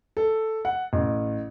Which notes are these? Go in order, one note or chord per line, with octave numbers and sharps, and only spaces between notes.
A4
F#5
A1